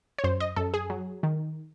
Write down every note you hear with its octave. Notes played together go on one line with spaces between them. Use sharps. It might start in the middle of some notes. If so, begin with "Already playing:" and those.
C#5
F#2 C5
D#5
F#2 A4
G#4
F#3
D#3